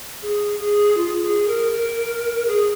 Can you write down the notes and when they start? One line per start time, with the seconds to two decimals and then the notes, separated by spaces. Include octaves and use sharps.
0.22 G#4
0.60 G#4
0.97 F4
1.22 G#4
1.47 A#4
1.73 A#4
2.47 G#4